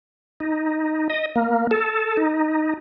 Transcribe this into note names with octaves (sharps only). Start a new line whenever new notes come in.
D#4
D#5
A#3
A4
D#4